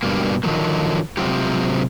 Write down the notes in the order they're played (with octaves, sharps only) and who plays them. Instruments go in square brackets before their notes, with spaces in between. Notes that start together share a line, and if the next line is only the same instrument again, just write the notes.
[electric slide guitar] G2 B2 G3 A#3
D3 D#3 F3 F#3 A#3
C3 F#3 G#3 C4 F4 G4